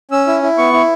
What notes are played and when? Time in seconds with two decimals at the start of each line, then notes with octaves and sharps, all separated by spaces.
0.11 C#4 E6
0.27 E4
0.43 E4
0.58 B3 C#6
0.73 E4